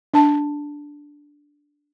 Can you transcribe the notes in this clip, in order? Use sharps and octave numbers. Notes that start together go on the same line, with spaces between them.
D4 A5